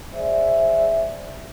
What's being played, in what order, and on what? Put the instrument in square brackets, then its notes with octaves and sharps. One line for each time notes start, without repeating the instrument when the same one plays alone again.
[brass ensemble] G#4 C5 D5 E5